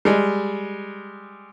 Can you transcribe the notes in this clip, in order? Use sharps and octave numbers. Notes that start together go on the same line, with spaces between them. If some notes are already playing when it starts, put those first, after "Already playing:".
G3 G#3